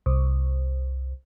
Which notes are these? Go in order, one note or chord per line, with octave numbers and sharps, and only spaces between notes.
C2